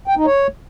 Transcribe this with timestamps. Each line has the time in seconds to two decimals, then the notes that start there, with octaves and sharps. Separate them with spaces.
0.08 G5
0.17 D#4
0.26 C#5